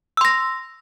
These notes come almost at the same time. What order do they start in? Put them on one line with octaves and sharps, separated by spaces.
E6 C6 A#6